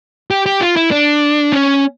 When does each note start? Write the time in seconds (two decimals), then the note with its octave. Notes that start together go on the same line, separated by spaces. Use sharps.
0.31 G4
0.46 G4
0.61 F4
0.76 E4
0.91 D4
1.52 C#4